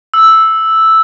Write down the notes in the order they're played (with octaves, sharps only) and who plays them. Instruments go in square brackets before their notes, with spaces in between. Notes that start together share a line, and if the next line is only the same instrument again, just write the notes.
[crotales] E6